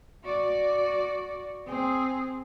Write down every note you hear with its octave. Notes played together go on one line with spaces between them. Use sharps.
F#4 D5
C4 G#4